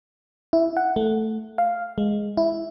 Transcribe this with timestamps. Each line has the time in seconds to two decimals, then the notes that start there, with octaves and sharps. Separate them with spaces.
0.53 E4
0.77 F#5
0.96 A3
1.58 F5
1.98 G#3
2.37 E4